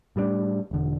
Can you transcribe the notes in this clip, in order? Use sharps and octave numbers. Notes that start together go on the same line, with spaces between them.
A2 G3 G#3 D4
E1 D3